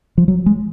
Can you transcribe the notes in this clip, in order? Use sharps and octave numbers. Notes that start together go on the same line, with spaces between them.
F3
F#3
G#3